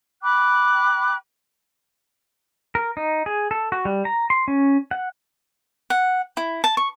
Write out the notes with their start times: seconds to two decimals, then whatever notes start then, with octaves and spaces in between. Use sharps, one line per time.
0.22 G5 B5 D6 F#6
2.75 A#4
2.97 D#4
3.26 G#4
3.51 A4
3.72 F#4
3.85 G3
4.05 A#5
4.30 C6
4.48 C#4
4.91 F#5
5.90 F#5
6.37 E4
6.64 A5
6.77 C#6